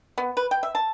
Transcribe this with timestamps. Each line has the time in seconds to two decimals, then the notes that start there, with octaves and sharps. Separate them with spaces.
0.18 B3
0.37 B4
0.51 G5
0.63 E5
0.75 A5